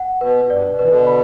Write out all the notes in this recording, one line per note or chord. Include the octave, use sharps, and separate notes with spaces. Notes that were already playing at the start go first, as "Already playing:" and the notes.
Already playing: F#5
B2 B4
G2 D5
B2
E3 B4
B2 D3
B5